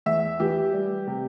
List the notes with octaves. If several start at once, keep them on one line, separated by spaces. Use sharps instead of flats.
E2 E5
E3 G4
G3
C3